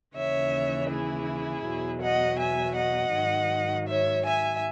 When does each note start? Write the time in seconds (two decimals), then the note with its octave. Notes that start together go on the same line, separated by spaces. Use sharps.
0.16 D#2 C#3 E3 C#5 E5
0.90 E4 G#4
1.65 E2 B2 F#3
2.01 D#5 F#5
2.39 E5 G#5
2.76 D#5 F#5
3.14 G#2 D#3 F#3
3.88 C#5 E5
4.26 E5 G#5